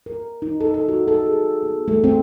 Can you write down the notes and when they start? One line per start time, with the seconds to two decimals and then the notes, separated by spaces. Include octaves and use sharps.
0.06 A#4
0.42 D#4
0.60 A4
0.74 A4
0.88 F#4
1.08 A4
1.26 G#4
1.63 B3
1.88 A3
2.04 C4